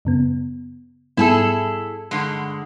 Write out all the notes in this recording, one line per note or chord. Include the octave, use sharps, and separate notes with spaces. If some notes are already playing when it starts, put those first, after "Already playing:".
F#2 C#3 B3
G#2 G3 B3 E4 G#4 A4
G2 D3 G#3